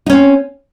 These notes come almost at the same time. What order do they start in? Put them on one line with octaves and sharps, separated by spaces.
D#4 C#4 C4